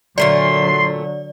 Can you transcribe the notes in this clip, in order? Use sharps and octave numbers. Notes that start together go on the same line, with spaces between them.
A#2 D3 F#3 A3 A#4 D5 C6